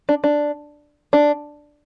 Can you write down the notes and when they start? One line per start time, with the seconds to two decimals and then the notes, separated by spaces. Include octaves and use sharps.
0.09 D4
0.24 D4
1.13 D4